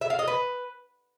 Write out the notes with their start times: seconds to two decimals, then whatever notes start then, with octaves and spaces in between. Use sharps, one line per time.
0.01 E5
0.10 F5
0.19 D#5
0.28 B4